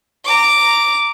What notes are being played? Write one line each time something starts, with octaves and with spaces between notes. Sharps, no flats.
A#5 D6